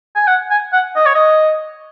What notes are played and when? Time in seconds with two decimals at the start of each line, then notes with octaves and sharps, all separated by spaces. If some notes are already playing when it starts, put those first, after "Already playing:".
0.15 G#5
0.27 F#5
0.51 G#5
0.73 F#5
0.96 D#5
1.06 C#5
1.15 D#5